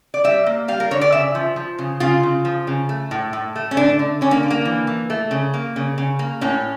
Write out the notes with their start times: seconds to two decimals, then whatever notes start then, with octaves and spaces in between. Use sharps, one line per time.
0.14 D5
0.24 G3 E5
0.46 A#3
0.68 G3 F5
0.80 A#4
0.91 D3 C#5
1.01 D5
1.12 C#3 E5
1.35 F3
1.56 F3
1.79 C#3
2.00 C#3 F4
2.23 C#3
2.45 F3
2.67 C#3
2.89 A3
3.11 A2
3.33 A2
3.56 A3
3.71 C#4
3.77 D3 D4
3.99 D3
4.21 D3 C#4
4.31 A#3
4.43 D3
4.51 A#3
4.65 E3
4.87 E3
5.10 A3
5.31 C#3
5.54 A#3
5.76 C#3
5.98 C#3
6.19 A#3
6.41 A2 C#4